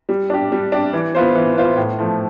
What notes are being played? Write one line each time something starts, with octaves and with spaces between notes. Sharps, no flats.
G3
D4 G4
G3
D4 G4
E3
B3 F4 C5
E3
B3 F4 C5
A2
F3 A3